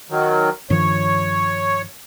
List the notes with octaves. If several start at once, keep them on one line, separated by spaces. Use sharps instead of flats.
D#3 F#3
G2 D#3 F3 C#5